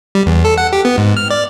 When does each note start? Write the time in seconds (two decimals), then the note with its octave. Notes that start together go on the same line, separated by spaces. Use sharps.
0.15 G3
0.26 E2
0.45 A4
0.58 F#5
0.73 G4
0.85 B3
0.98 G#2
1.17 F6
1.30 D5